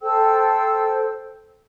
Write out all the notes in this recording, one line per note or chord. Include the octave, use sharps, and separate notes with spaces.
A4 C5 G5 E6